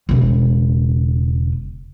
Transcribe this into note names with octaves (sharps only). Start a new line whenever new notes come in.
E1 C#3